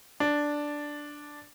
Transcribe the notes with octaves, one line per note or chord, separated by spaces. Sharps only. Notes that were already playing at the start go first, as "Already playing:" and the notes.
D4